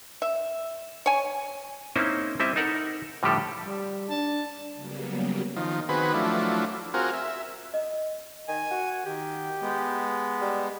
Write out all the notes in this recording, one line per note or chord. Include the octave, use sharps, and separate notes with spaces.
E5
C#5 G#5
A#3 C4 C#4 D#4 E4 C5
G3 C4 E4 D#5 E5
D#4 A4 A#4 F#5
A2 D3 F3 G3 G4 A4
G3
D4 A5
C#3 F#3 G3 A#3 B3
D#3 F3
D#3 B3 C4 F#4 G#4 B4
F3 F#3 A3 D4 E4
C4 F4 F#4 G#4 A#4
E5
D#5
D#3 G#5
F#4
D#3 G4
G#3 B3
G3